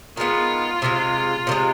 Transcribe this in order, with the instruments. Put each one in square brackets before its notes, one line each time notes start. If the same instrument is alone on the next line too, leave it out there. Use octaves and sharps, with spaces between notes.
[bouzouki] D#3 G#3 B3 [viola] F4
[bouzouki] C3 E3 G#3
C3 D#3
G#3